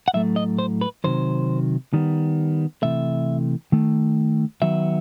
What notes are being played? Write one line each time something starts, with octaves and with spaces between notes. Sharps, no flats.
F#5
A2 F#3 A3 E5
D#5
C5
B4
C3 D#3 F#3 C5
D#3 G3 B3
C3 E3 A3 E5
D#3 A3
D#3 F#3 B3 E5